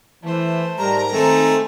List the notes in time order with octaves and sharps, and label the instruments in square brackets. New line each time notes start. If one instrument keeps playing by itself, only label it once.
[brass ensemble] E3 [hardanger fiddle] A3 C5
[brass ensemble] G#2 G3 A#4 [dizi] A#5
[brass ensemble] D#3 C4 [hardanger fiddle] G#3 D#4 [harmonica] A3